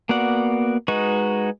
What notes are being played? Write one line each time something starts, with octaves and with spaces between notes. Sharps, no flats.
A#3 B3 F#4 D5 F#5
G#3 D#4 F#4 B4 C#6